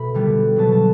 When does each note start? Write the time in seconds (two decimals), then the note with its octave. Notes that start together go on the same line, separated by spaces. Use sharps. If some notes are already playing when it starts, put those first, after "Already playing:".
Already playing: B2 A3 B5
0.14 D3 G3 B3
0.56 B2 F#3 B3 A5
0.72 A5